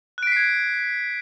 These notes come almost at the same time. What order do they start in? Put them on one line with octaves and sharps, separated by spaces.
F#6 D7 B6 C7 G#6